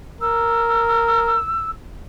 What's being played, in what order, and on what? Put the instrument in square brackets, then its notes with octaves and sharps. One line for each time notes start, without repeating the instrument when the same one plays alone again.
[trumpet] A#4 [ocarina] E6